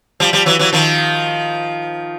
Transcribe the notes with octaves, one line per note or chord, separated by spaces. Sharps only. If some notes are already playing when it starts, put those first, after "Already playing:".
F3 G3
F3 G3
E3 F#3
E3 F#3
D#3 F3